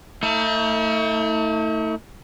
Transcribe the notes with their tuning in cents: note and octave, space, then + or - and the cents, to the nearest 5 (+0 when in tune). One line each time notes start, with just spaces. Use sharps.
A3 +30 E4 -45